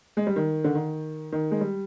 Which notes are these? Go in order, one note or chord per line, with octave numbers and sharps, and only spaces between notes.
G#3
G3
D#3
D3
D#3
D#3
G#3
G3